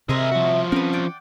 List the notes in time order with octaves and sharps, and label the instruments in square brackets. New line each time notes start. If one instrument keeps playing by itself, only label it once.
[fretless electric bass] C3 [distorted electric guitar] G#4 A#4 [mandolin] D#5 E5 C6
[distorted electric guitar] F3 F#4
[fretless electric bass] C4 C#4 [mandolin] A#4 B4
[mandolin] D5 F#5 G5